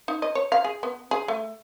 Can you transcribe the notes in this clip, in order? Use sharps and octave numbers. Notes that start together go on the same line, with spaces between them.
D#4
D#5
C#5
F5
G#4
B3
G#4
A3